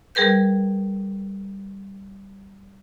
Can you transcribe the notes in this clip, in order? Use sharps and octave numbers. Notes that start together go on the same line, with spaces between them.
G3 G#4 A#4 B4 G6